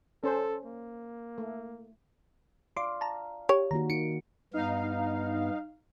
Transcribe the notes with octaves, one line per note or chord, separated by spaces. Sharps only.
C#4 A4 C5
A#3
A3
D5 F5 C6 D6
A5 A#5
G4 C#5
D#3 A#3 F#4 A#5
D#4 C#7 D7
G2 B3 D#4 F5